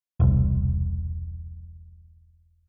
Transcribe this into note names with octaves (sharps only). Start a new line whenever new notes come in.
E1 C2